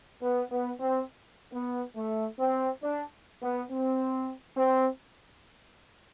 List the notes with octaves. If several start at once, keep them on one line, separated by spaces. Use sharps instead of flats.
B3
B3
C4
B3
A3
C4
D4
B3
C4
C4